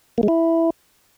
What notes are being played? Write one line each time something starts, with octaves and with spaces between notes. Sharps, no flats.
A#3
G#3
E4